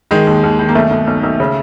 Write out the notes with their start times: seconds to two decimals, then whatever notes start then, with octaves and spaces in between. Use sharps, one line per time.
0.11 D#3 G#3
0.27 D#2
0.43 D#2
0.59 D#3
0.69 A#3
0.75 B1 A3
0.91 B1
1.07 B1
1.23 B1
1.40 C#3